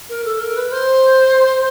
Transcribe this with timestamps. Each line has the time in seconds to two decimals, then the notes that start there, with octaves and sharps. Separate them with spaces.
0.09 A#4
0.25 A4
0.41 A#4
0.57 B4
0.72 C5